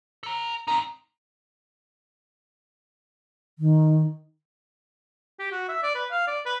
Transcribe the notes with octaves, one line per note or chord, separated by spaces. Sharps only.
A4 A#5
C4 D#4 A#5
D#3
G4
F#4
E5
D5
B4
F5
D5
B4